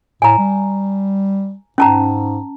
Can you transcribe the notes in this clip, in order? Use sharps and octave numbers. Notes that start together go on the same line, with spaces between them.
A2 G#5 A#5
G3
G#2 C#4 A5 A#5